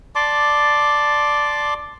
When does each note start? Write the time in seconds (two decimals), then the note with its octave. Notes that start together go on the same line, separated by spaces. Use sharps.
0.15 D5 A5 C6 D6